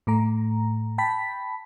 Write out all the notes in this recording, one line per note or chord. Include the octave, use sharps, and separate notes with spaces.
A2 A3 A#5
G5 A5 B5 B6